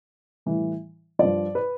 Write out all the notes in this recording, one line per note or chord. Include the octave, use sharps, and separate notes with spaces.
A2 E3 G3
G2 F3 D5
B4